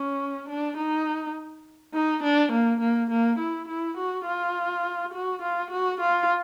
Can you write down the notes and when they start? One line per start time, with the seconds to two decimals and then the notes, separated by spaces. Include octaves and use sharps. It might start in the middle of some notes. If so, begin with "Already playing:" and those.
Already playing: C#4
0.49 D4
0.77 D#4
1.94 D#4
2.23 D4
2.52 A#3
2.80 A#3
3.10 A#3
3.39 E4
3.68 E4
3.97 F#4
4.26 F4
5.13 F#4
5.42 F4
5.71 F#4
6.01 F4